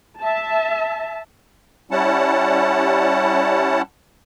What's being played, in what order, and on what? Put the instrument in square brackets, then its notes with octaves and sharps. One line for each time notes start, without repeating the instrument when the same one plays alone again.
[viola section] E5 A5
[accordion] G3 C#4 E4 F#5 A5